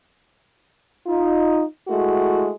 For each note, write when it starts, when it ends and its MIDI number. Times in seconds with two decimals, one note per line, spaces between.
1.06 1.63 63
1.06 1.63 65
1.87 2.49 56
1.87 2.49 57
1.87 2.49 64
1.87 2.49 66